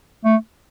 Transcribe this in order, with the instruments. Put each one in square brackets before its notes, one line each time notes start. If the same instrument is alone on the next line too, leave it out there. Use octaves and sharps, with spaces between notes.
[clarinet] A3